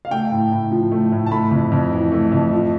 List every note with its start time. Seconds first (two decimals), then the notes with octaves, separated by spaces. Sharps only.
0.05 F5
0.11 A3 G5
0.31 A2
0.52 A2
0.72 F3
0.92 A3
1.12 A2
1.26 A5
1.31 A3 B5
1.51 F2
1.72 F2
1.93 E3
2.12 A3
2.32 F2
2.53 F3